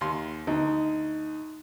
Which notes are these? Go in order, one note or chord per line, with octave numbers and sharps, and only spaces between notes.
D#2 C6
D2 D#4